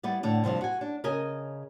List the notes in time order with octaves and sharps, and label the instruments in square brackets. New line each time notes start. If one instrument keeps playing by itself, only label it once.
[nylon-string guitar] G3 B3 E4 D5
A2 D3 D5
G2 C3 F3 G3
F#4 G#5
D4
C#3 A#4 D#5 G#5